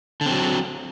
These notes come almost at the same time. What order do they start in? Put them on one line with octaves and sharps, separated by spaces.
D3 C4 F#3